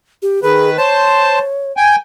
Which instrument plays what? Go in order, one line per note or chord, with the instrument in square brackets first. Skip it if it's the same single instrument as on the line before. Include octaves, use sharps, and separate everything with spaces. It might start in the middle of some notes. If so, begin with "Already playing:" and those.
[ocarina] G4
[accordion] D#3 B4 [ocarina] G#4
[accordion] C5 A5 [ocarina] C#5
[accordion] G5 G#5